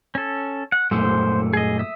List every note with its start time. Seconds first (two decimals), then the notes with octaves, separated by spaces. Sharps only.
0.15 C#4 A4
0.72 F#5
0.91 F#2 A#2 A3 C5
1.53 G#4 D#5
1.79 E5 D#6